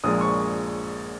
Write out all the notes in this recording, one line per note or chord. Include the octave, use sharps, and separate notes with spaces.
A#1 A#2 F3 G#3 D#6
C#6